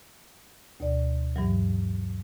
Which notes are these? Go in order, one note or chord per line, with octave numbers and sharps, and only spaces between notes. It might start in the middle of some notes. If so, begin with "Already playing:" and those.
D2 B2 D5
G2 E3 F#3